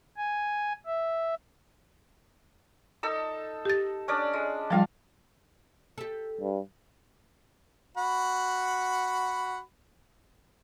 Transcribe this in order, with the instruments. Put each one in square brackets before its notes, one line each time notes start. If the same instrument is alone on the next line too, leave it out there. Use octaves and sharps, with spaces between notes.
[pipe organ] G#5
E5
[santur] D#4 A4 E6
[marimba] G4 A6
[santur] C#4 D4 D5
G#3
[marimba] F3 G3 [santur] F4 F5 A5
[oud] G4 A4
[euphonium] G2
[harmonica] F#4 F#5 B5